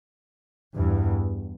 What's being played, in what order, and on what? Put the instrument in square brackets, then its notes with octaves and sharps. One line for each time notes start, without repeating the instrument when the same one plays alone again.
[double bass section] E2 G2